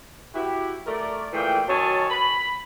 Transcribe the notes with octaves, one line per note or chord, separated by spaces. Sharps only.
E4 F#4 G4
A3 A#4 D5
A#2 E3 A3 G#4 G5
D#3 F#3 C#5 G#5 A5
B5